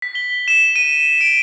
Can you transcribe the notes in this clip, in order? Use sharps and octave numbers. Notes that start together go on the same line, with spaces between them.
B6
G7
E7
D#7
D7